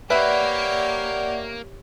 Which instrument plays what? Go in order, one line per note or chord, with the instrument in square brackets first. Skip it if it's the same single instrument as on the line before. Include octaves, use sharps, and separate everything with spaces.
[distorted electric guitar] A#3 [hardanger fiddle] G4 C#5 [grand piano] B4 E5 [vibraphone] D5 F#5